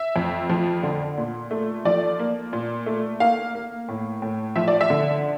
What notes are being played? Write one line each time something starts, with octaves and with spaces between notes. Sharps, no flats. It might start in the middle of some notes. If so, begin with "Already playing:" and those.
Already playing: E5
F2
F3
D3
A#2
A3
F3 D5
A#3
A#2
A3
A#3 F5
A#3
A2
A2
F3 E5
D5
E5
D3